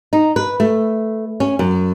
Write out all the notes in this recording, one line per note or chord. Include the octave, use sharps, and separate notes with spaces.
D#4
B4
A3
C#4
F#2